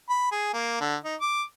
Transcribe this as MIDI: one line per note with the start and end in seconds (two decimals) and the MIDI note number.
0.09 0.29 83
0.32 0.50 68
0.54 0.77 58
0.81 0.96 50
1.05 1.15 63
1.21 1.42 86